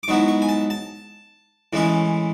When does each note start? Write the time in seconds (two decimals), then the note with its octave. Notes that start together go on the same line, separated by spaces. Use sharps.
0.03 D6
0.08 G#2 F#3 B3 E4 C#6
0.28 C#6
0.42 G#5
0.49 A5
0.70 A5
1.73 A2 E3 G#3 C#4 E4